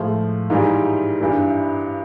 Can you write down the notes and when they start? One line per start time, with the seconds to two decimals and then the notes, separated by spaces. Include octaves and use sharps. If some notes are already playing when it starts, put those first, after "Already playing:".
Already playing: A2 F3 G#3
0.50 G#2 E3 G3 D#4 F4
1.21 G2 E3 G3